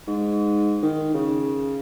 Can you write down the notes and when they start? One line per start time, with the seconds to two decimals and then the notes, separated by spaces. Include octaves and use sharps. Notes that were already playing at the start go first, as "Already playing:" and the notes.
0.07 G#2
0.82 D#3
1.14 C#3